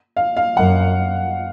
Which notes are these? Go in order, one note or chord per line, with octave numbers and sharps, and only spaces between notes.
F5
F5
F#2 F#5